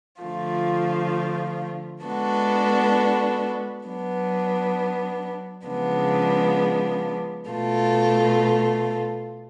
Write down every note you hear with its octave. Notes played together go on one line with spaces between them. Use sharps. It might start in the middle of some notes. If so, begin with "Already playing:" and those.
D3 F3 A3 F4
G#3 B3 D4 F#4 A4
F#3 B3 D4
C#3 F3 G#3 B3 D4
B2 A3 F4 A4